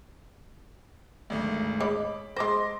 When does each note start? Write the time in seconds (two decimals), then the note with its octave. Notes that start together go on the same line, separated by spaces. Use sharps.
1.30 G#1 D2
1.81 G#3 C#5 B5 D6
2.36 G#3 C5 C6 D6 A#6